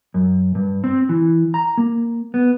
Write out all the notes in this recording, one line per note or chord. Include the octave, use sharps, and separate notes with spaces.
F#2
G2
C4
E3
A#5
A#3
B3